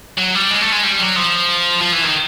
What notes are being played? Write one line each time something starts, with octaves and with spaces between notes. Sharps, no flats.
F#3
G3
G#3
A3
G#3
G3
F#3
F3
F3
E3
D#3